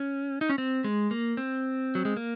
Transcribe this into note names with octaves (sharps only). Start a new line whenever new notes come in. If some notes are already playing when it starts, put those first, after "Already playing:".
Already playing: C#4
D#4
C#4
C4
G#3
A#3
C4
F#3
G#3
A#3